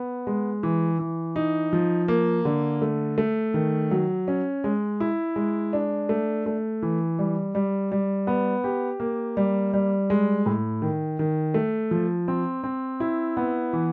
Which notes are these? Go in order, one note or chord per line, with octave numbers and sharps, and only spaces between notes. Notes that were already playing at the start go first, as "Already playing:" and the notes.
Already playing: B3
G#3
E3
E3
D#4
F3
A#3
D3
A3
A3
D#3
F#3
C#4
G#3
E4
G#3
D4
A3
A3
E3
G3
G3
G3
B3
G4
A#3
G3
G3
G#3
A2
D#3
D#3
A3
F3
C4
C4
E4
B3
E3